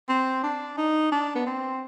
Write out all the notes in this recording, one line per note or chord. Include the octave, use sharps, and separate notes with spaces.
C4
D4
D#4
D4
B3
C4